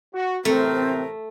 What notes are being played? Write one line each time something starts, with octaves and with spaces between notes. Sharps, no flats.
F#4
A1 C3 A3 C4 A#4